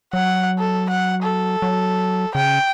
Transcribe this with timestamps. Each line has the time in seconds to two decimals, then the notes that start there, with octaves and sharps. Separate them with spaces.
0.13 F#3 F#5
0.59 A4
0.89 F#5
1.23 A4
1.62 F#3
2.35 C#3 G5